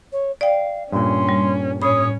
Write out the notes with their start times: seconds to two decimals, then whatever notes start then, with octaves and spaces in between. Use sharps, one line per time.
0.12 C#5
0.41 D5 F5 G5
0.92 G2 A#2 C#4 C6
1.29 G3
1.82 A2 C#4 C#5 B5 D#6